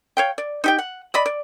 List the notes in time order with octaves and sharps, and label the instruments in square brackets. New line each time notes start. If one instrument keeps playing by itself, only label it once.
[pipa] C#5 F5 G5
D5
D#4 G4 G5
F#5
D5 D#5 B5
D5